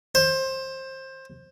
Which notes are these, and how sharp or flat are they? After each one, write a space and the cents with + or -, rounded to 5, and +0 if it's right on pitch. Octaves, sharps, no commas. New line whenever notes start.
C5 +20